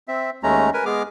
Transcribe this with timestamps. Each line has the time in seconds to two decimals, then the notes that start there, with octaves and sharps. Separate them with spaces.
0.08 C4 E5
0.43 D#2 G#3 A3 C#4 A#5
0.74 A#4 B4 G#5
0.86 G#3 B3 G#4 D6 F6